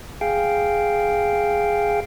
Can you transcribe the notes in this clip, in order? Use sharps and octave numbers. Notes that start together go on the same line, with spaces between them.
G#4 F5 G5